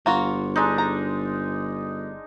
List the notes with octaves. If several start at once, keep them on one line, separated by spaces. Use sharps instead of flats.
G1 A#3 F4 F#4
G#3 D4 D#4
A#5